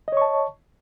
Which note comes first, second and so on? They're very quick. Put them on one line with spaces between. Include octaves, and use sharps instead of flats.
D#5 C#5 C#6 A5